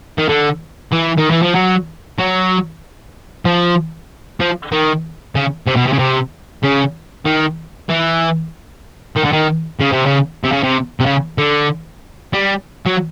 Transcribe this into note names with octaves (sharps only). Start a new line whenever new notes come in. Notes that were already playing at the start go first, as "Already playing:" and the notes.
D#3
D3
E3
D#3
E3
F3
F#3
F#3
F3
F3
D#3
C#3
C3
B2
C3
C#3
C3
C#3
D#3
E3
D#3
D3
D#3
C#3
C3
C#3
C3
C#3
C3
C3
C#3
D3
G3
F#3